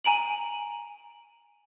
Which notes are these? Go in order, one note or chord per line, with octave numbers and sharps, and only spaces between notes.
G#5 A#5 D7 F#7